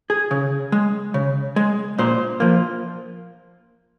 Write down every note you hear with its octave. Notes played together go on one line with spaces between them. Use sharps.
G#4
C#3
G#3
C#3
G#3
A#2 C5
F3 A#3